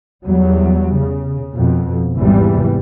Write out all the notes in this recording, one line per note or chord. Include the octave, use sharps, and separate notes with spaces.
E2 F#3 G3
C#3
F2 B2
G#1 E2 C3 E3 G3